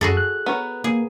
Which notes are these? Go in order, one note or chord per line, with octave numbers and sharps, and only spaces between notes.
F#2 F#4 G#4 A4
F#6
B3 A#4 C#5
A#3 G#4